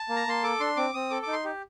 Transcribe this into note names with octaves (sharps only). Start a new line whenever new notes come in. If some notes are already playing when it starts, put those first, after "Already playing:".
Already playing: A5
A#3
A#5
A#3 C6
A4 D6
D4 C6
C4 D6
C4 D#6
A4 D6
D#4 D6
C6
G4